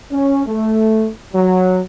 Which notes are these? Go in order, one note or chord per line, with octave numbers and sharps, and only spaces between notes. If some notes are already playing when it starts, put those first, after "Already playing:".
C#4
A3
F#3